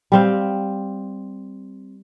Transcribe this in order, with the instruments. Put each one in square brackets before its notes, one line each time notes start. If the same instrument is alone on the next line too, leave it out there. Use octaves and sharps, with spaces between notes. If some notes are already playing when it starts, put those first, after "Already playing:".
[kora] G3 C4 F5